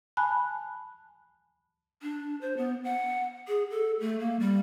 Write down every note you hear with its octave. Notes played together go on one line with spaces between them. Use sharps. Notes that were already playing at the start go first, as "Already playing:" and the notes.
G#5 A5 B5 F#6
D4
C5
B3
F#5
G#4
A4
A3
A#3
G3